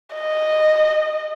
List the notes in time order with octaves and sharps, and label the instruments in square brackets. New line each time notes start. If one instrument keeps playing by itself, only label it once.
[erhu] D#5